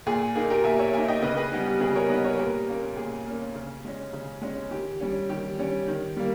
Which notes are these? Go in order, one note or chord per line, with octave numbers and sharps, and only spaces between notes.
A#2 G#4
A#3 D#4 G#4
G4 A#4
A#2 E5 G#5
C#5 E5
A#3 D#4 E5 G#5
D#5 G5
C#3 B4 D#5
G#4 B4
G3 B3 D#4 G4
G4
C#3 G#4 B4
A#4 C#5
G3 B3 D#4 B4 D#5
A#4 C#5
A#2 G4 A#4
A#3 C#4
A#2 G#4
A#3 C#4
C#3
G#3 C#4
C#3
G#3 C#4
D#3 G4
G3 C#4
D#3 G4
G3 C#4
D#3
G3 A#3